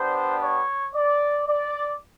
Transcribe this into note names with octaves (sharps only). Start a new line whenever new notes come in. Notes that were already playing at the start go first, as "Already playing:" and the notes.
Already playing: G3 B3 D4 C5
C#5
D5
D5